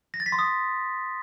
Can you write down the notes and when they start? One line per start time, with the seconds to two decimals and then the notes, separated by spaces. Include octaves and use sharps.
0.14 A#6
0.20 A6
0.26 B6
0.32 C6
0.39 D#6